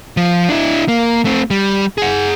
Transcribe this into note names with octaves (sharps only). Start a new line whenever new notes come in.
F3
D4 E4
A#3
A3 C4
G3
G#4 F#5